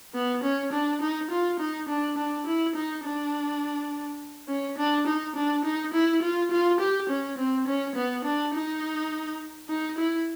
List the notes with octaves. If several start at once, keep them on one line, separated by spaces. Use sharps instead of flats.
B3
C#4
D4
D#4
F4
D#4
D4
D4
E4
D#4
D4
C#4
D4
D#4
D4
D#4
E4
F4
F4
G4
C#4
C4
C#4
B3
D4
D#4
D#4
E4